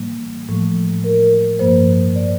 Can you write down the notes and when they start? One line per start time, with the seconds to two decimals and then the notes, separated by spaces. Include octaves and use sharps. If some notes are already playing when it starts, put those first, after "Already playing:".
Already playing: A2 E3 G3 A#3
0.49 A2 F3 A3
1.04 A#4
1.59 G2 F3 A#3 C5
2.16 D5